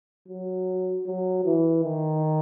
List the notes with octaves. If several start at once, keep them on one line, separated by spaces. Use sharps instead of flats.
F#3
F#3
E3
D#3